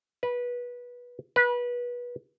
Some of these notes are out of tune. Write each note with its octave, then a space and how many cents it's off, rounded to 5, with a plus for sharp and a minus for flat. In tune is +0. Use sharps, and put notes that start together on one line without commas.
B4 -20
B4 -25